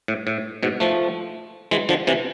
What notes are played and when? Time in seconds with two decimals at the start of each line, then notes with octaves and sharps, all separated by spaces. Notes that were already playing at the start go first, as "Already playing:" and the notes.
0.08 A2
0.27 A2
0.63 G#2 B2
0.80 F3 A3
1.71 E3 G#3
1.89 D3 F3
2.07 C3 E3